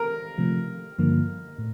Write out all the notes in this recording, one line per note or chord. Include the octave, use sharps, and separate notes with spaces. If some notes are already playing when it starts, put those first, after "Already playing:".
Already playing: A#4
C3 F3 A3
G2 D3 F3 A#3
A2